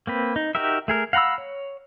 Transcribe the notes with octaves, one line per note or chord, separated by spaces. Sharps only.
A#3 C4 B4
D#4
D#4 F#4 G4 A#4 E5
A3 G#4 A#4
F5 F#5 A#5 B5 E6
C#5